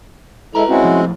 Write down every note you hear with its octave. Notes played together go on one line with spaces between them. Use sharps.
G#3 E4 A4 B4 A#5
G#3 C4 C#4 E4 F#4
A2 F3